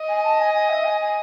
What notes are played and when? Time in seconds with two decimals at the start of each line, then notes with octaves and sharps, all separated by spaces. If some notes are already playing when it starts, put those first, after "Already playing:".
Already playing: D#5
0.09 G#5
0.24 A5
0.39 G#5
0.54 G#5
0.70 E5
0.84 G#5
1.01 G#5